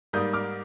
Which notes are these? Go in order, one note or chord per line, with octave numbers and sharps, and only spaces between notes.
G#2 G3 A#3 D#6 G6
D6 F6